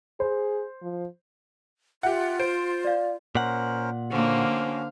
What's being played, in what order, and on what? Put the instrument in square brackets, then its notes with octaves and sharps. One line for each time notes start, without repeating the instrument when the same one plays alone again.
[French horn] G#4 [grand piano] C5
[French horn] F3
[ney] F4 [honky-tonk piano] G4 F#5 [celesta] E5
[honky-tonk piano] C5 [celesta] D7
[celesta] D5 F5
[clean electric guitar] A#2 F#5 [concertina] C#4 A#4 C5
[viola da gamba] D3 A#3 [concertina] C#4 F#4 [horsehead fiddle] C5 F5